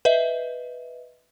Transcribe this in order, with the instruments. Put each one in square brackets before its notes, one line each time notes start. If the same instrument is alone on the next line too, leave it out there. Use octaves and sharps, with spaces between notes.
[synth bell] B4 D#5 E5